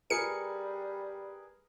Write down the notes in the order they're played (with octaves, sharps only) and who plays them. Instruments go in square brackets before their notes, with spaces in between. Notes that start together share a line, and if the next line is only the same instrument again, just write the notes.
[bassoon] G3 [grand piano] G#4 A#4 B4 [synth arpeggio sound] C#7